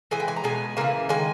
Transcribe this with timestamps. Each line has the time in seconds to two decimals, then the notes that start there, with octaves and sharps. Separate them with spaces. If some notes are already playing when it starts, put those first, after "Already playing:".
0.11 E3 G#3 G#5
0.20 G5
0.28 G#5
0.36 A#5
0.44 B2 G#3 G#5
0.77 C#3 E3 A#3 G#5
1.09 D#3 G#3 G#5